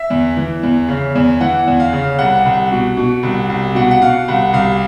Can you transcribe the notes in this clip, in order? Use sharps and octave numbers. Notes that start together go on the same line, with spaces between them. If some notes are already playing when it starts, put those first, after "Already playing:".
Already playing: E5
E2
E3
E2
C#3
E2
E3 F#5
E2
F5
C#3
C2 F#5
C2
B2
B2
C2
C2
B2 F#5
F#5
B2 F5
C2 F#5
C2 F5